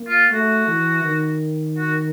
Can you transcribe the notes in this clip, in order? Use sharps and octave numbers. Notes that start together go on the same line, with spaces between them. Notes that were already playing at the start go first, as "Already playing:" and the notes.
Already playing: A#3
F4
A3 F#4
E3
D#3
F#4